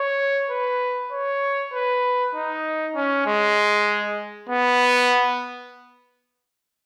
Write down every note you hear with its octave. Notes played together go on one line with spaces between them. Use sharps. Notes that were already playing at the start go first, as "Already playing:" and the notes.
Already playing: C#5
B4
C#5
B4
D#4
C#4
G#3
B3